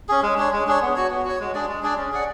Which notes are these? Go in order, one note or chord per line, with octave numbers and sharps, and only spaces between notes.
C#4 G#4
G#3
D4 G#4 C#5
G#3
D4 G#4 C#5
B3
F#4 C#5
B3
F#4 C#5
G#3
D4 G#4 D5
G#3
D4 G#4 D5
C#4
G#4 D5 F#5